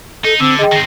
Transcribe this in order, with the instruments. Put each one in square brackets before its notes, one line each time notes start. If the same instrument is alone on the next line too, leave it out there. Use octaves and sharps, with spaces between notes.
[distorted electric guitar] D#4 [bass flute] A4
[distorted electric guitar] D3 [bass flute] C4 [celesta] E6
[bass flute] G#4 [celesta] D#5 G5
[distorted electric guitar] D#3 C4 [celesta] A#6 C7